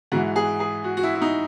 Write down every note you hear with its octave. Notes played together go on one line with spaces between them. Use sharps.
G#2 E3 F#4
G#4
G#4
F#4
F#4
E4
E4
D#4